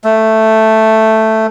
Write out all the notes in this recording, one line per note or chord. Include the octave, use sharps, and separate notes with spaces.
A3